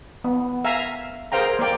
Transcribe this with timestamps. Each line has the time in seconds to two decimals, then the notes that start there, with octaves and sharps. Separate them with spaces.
0.24 B3
0.64 E5 F5 G#5 A#5
1.32 G#4 A#4 C5 F5 G5 A#5
1.59 A#3 A#4 D5 G5